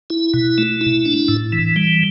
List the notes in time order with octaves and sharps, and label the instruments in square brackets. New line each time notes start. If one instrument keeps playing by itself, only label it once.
[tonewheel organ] E4
B2
A3
E4
D4
A2
E3
G3